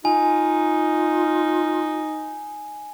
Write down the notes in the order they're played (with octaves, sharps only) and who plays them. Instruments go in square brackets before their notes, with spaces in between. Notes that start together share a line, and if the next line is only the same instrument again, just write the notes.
[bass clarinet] D#4 [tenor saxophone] F4 [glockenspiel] G#5